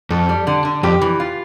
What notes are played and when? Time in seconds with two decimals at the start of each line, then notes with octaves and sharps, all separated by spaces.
0.10 F2 A4
0.29 G3
0.47 D3
0.65 D3
0.83 F2 G4
1.01 E3
1.20 F4